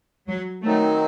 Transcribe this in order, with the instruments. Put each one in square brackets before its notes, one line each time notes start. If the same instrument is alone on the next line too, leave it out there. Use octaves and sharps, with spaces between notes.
[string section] F#3
[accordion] D#3 F#3 C4 D#4 [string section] A3